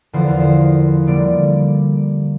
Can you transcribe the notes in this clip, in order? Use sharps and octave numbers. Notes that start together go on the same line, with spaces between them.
E2 D3 F3 C5
A#4
C5
D3 G3 A#3 D5